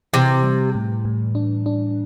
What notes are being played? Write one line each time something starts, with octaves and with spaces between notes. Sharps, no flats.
C3 E3
G3
A2
A2
D4
D4